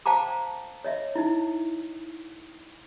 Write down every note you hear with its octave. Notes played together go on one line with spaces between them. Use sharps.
C5 F5 G5 A5 A#5 D6
C#5 D#5 E5
D#4 E4